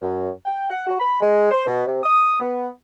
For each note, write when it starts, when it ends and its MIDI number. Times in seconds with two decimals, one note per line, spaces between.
0.01 0.29 42
0.45 0.68 79
0.70 0.86 78
0.87 0.95 66
1.00 1.19 83
1.20 1.47 56
1.51 1.64 72
1.66 1.83 47
1.86 1.99 48
2.03 2.37 87
2.40 2.68 59